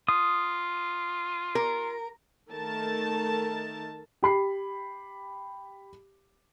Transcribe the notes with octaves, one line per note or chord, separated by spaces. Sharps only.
F4 D#6
A#4
D#3 A3 A#4 A5
G4 B5 C7